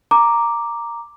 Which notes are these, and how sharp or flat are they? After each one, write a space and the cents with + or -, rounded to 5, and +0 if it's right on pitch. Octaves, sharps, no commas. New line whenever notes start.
A#5 +0 D6 +0